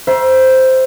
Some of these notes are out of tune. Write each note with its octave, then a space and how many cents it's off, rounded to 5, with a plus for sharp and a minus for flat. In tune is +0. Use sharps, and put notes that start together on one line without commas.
C5 -5 E5 +20 A#5 +40